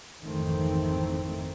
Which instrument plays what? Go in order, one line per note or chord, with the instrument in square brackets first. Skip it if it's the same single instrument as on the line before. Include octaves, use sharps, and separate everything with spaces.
[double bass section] G#1 F2 D#3 E3 A3 C4